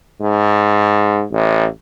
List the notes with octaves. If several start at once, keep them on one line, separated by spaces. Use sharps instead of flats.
G#2
A1